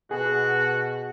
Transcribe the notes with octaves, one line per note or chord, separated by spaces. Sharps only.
B2 F#4 G#4